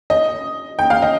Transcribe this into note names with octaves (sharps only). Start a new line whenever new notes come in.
D#5
G5
F5
D#5